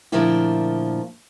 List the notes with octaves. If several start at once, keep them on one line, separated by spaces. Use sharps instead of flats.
A#2 D3 F3 A3 A#3 E4